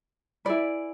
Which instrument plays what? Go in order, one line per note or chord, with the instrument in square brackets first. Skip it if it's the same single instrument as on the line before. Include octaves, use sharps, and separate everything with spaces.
[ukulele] E4 G#4 B4 D5